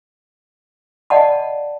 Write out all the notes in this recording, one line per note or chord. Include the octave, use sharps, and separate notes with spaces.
D5 D#5 F5 F#5 A5 B5